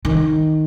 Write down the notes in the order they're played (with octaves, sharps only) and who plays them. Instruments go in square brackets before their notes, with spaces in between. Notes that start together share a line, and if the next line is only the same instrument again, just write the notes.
[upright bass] D#3